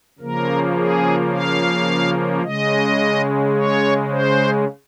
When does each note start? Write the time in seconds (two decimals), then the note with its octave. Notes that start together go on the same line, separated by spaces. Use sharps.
0.19 C#3 F3 A#3 A#4
0.76 G#4
1.32 F5
2.43 C#3 G#3 D#5
3.55 C#5
4.11 C5